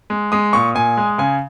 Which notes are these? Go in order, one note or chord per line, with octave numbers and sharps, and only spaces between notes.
G#3
G#3 D#6
A#2 C#6
A#2 G#5
G#3
C#3 G#5